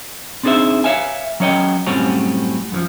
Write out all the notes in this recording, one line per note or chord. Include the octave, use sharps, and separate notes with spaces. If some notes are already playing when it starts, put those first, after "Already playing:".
C4 D4 D#4 G#4 C5 E5
C#5 E5 F5 G#5
F#3 C#4 C#5 D#5 G5
F#2 A2 G3 C4 C#4 F#4
F#2 E3 F3